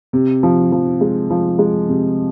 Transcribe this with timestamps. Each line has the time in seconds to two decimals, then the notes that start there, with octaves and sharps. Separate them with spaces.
0.13 C3
0.43 F3
0.72 F3
1.01 G#3
1.30 F3
1.59 G#3
1.88 C3